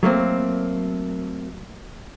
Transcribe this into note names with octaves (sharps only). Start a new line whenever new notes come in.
F#3 A3 A#3 C4